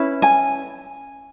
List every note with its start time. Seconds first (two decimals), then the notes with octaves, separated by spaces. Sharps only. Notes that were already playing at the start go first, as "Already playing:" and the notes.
Already playing: C#4 E4 B4
0.22 G#5